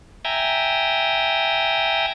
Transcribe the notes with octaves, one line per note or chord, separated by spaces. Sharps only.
E5 G5 G#5 A#5